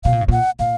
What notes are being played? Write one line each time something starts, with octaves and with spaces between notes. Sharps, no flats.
B2 F5
A#2
G#2
A#2 F#5
A#2 F5